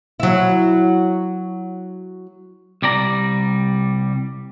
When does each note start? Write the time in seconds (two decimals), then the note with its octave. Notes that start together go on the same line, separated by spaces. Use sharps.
0.20 F#3 E4
2.82 C2 G3 D5 A#5